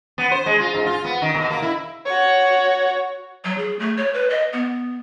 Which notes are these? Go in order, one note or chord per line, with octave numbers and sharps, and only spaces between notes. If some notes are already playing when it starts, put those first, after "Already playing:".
B3
C5
G#3
F4
G#2
F4
B3
D#3
B2
A#3
E4
F#4 C#5
F#3
G#4
A3
C#5
B4
D#5
B3